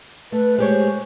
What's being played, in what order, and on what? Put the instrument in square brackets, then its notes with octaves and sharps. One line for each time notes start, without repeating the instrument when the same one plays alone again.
[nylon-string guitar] A3 [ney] B4
[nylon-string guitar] G#3 G4 C#5 [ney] C5